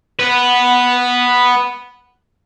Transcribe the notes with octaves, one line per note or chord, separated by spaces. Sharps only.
B3 B4